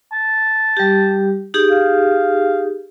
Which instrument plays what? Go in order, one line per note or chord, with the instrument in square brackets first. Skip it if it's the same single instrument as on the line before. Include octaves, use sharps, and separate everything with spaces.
[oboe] A5
[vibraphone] G3 G4
D#4 G4 G#4
[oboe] F5